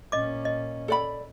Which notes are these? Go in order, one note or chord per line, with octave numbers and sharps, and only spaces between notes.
A#2 C#4 D#5 D6
D#5
A4 D5 B5